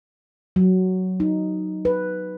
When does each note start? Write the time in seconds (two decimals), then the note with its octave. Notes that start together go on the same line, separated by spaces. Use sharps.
0.56 F#3
1.20 D#4
1.85 B4